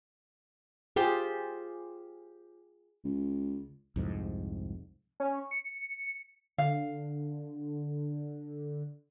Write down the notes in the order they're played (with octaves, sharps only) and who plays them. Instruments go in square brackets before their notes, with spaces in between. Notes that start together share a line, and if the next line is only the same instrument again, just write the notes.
[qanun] F4 G4 C5 [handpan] G#4
[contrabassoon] C#2
[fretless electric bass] C2 F2 G#2
[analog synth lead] C#4
C#7
[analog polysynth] D3 [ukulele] F5